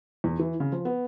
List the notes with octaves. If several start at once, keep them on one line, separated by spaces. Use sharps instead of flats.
E2
E3
C#3
F3
B3